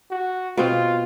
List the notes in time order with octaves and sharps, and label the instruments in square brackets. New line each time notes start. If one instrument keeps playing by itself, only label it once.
[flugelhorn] F#4
[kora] B2 C4 [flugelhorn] F4